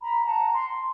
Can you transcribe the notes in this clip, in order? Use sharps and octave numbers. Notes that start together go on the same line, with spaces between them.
A#5 B5
F#5 A5 A#5
C6